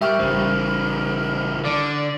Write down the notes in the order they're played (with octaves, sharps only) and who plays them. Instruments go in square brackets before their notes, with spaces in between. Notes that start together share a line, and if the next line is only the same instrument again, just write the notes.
[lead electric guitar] G3 [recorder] A#4 [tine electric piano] E5 G5 C#6
[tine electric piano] A1 G3 C5 [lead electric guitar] C#3 E3
[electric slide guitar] D3 [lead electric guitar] D5